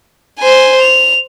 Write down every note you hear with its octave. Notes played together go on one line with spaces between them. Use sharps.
C5 G#5
F7